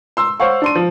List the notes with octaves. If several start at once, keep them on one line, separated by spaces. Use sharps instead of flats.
C6 E6
C5 C#5 F5 F#5 C#6
D4 C6 D#7
F3